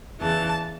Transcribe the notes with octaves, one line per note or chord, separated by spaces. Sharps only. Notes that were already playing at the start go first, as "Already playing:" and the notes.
E2 C#3 E3 A5